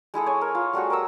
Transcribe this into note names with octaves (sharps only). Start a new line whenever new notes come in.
G#3 E4 G#4 A4
C#5 G#5
A#4
F4
G3 A3 F#4 G#4
A#4 D#5 A#5 E6